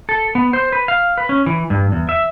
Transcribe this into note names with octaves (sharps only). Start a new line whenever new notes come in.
A4
B3
C5
B4
F5
B4
C#4
E3
G2
E2
E5